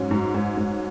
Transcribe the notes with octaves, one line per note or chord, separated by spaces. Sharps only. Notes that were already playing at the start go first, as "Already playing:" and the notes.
Already playing: G#2 F#3 C#4
G#2
G#2
G#2